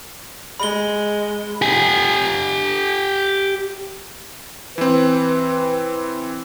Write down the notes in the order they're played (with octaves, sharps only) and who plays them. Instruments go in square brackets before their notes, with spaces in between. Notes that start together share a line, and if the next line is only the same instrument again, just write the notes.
[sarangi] G#3 [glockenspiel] B5 G7
[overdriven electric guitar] G4 G#5
[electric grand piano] E3 C4 [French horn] B4